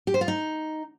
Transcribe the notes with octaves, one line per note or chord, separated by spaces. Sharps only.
G4
C5
F4
D#4